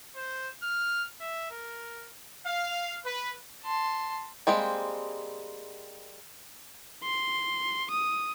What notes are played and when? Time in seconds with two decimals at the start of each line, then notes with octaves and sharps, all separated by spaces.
0.15 C5
0.63 F6
1.20 E5
1.51 A#4
2.45 F5
3.04 B4
3.63 A5 C6
4.47 G3 G#3 A#3 C4
7.04 C6
7.91 D#6